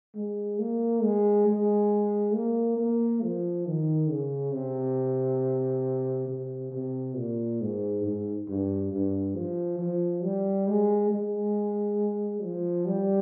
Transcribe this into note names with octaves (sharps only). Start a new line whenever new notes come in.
G#3
A#3
G#3
G#3
A#3
A#3
F3
D#3
C#3
C3
C3
C3
A#2
G#2
G#2
G2
G2
F3
F3
G3
G#3
G#3
F3
G3